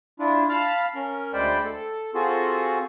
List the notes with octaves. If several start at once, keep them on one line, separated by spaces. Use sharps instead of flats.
D4 E4 F4
F5 A5 B5 F6
C#4 A#4
D2 G#3 C5 D5 G5 B5
A4
C4 F4 F#4 G#4 A4